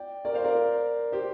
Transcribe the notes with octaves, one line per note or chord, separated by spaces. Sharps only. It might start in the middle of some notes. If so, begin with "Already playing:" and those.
Already playing: D5 G5
A#4 D5
C5 F5
A#4 D5
G4 C5